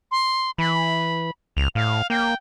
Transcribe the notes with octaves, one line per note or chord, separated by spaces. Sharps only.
C6
E3 B5
C#2 F7
A2 F5
A#3 G5